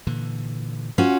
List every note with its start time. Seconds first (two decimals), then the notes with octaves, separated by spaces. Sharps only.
0.07 A#2 D3 E3
0.98 C#4 F4 F#4